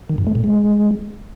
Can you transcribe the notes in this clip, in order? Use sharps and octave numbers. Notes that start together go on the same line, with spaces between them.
D#3
G2
A3
A#2
G#3